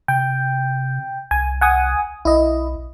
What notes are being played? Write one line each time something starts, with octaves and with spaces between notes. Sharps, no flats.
C3 G5
C2 G#5
F#5 G#5 D#6
B1 E4 D#5